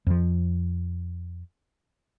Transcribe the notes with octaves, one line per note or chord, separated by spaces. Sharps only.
F2 F3